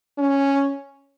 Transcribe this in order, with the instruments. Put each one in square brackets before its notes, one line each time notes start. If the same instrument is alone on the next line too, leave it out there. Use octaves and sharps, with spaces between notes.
[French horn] C#4